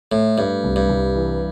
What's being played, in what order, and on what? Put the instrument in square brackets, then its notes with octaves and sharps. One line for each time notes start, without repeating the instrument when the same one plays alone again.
[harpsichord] A2 [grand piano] A3
[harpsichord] G2 [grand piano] A3
[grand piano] C2
[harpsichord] G2
[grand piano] C2
E3